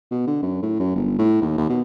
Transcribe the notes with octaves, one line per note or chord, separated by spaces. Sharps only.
B2
D3
F#2
A2
F#2
G1
A2
D#2
D#2
B2